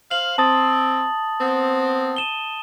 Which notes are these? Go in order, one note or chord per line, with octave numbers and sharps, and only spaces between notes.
C5 F5 F#7
C4 A5 D#6 A6
B3 C4
D#7 E7 G7